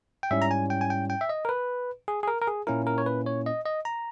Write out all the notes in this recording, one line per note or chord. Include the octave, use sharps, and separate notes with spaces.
G5
G#2 G3 C#4 E4 E5
A#5
G#5
G5
G#5
G5
G5
E5
D#5
A#4
B4
G#4
G#4
A#4
A#4
G#4
A#2 A#3 C#4 E4 A#4
A#4
C#5
B4
C#5
D#5
D#5
A#5